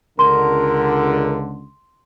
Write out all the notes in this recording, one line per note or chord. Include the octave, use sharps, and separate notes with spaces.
C#2 D3 A#4 C6